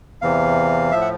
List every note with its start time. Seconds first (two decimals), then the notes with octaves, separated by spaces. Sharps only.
0.22 E2 C3 E3 F5
0.91 A2 F3 E5
1.01 F#5